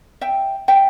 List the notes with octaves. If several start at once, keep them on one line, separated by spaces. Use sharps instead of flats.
E5 G5
E5 G5